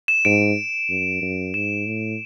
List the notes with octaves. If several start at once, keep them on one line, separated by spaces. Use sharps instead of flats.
E7
G#2 D7
F#2
F#2
G#2 E7
A2